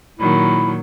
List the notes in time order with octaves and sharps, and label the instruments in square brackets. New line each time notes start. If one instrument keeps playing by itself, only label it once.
[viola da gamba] A#2 D#3 F#3 [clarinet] E4